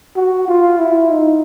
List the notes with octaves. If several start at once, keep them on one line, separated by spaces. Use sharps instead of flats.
F#4
F4
E4
D#4